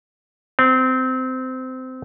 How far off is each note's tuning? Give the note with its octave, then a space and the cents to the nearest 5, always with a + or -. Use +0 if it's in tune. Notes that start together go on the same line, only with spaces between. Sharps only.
C4 -20